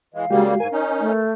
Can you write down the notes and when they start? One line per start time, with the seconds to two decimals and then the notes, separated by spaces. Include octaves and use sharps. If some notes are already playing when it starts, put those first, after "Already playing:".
0.14 E3 G#3 F5
0.30 C#3 G3 G#3 A#3 F#4 G4
0.60 G#2 A#4 G#5
0.72 C#4 D#4
1.00 A3